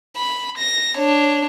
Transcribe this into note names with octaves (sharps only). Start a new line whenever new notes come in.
B5
A#6
D4 C#5